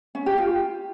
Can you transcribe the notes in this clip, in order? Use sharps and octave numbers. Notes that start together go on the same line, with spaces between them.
C#4
G4
F4